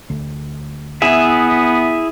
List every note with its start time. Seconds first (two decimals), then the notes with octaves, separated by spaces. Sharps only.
0.10 D2
1.02 B3 E4 G#4 E5